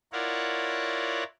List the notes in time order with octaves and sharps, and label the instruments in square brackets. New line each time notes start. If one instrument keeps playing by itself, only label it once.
[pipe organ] E4 F4 A#4 C#5 D5 F#5